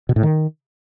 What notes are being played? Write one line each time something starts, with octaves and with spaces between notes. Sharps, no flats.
B2
A2
D#3